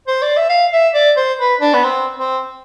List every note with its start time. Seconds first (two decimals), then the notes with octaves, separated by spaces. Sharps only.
0.08 C5
0.22 D5
0.37 E5
0.49 F5
0.73 E5
0.95 D5
1.17 C5
1.39 B4
1.61 D4
1.74 B3
1.84 C4
2.17 C4